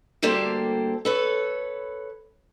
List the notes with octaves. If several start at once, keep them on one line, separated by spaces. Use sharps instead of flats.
D2 G3 A#3 G4 A4 C5
A4 B4 C#5